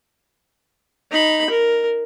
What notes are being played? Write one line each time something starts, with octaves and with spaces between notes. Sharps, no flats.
D#4 B5
A#4